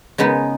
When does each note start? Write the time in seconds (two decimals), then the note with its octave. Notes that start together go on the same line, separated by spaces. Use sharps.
0.18 C#3 G#3 B3 D#4